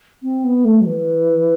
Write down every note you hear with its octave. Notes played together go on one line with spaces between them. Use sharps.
C4
B3
A3
F#3
E3